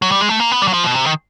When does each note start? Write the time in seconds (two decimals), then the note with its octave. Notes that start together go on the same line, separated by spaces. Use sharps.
0.02 F#3
0.12 G3
0.20 G#3
0.29 A3
0.40 A#3
0.51 B3
0.62 G3
0.68 F#3
0.73 F3
0.84 B2
0.95 C3
1.06 D#3